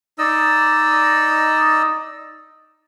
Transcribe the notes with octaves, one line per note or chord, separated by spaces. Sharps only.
D#4 D5 D#5 E6